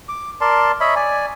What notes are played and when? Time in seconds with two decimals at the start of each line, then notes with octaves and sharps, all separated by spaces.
0.09 D6
0.41 A#4 D5 A5 C6
0.81 C#5 D#5 E5 B5
0.96 D5 G#5